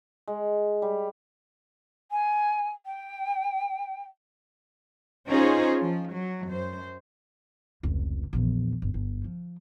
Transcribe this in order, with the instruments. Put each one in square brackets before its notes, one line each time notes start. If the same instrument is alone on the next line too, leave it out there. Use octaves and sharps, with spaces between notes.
[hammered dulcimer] G#3
G3
[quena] G#5
G5
[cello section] C#4 D#4 F4 G#4 C5 C#5
F3
F#3
F#2 C5
[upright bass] F1 C#2
A#1 E2
G1
G1
F3